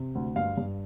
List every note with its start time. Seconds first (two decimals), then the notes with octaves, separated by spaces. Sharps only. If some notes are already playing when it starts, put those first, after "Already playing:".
Already playing: C3
0.15 D2
0.36 G2 F5
0.57 G2